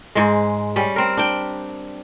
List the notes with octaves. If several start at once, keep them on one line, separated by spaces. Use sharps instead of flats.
G#2 G#3
G3 C#4
C4 A#4
D4 G5